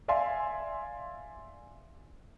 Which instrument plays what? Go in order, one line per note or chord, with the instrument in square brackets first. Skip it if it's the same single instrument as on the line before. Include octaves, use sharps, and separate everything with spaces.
[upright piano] D5 E5 F5 G#5 C6